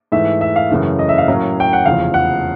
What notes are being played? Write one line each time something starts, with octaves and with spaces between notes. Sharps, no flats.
G#2 E3 A3 E5
E5
F5
F#2 C#3 E3 A3
D#5
E5
F5
A2 F#3 A#3 C#4
G5
F#5
F1 E2 C#3 F3 F5
F#5